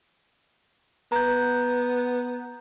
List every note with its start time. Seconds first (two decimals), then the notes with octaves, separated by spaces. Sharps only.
1.12 B3 A#5 G6